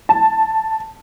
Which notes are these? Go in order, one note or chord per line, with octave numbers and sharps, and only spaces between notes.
A5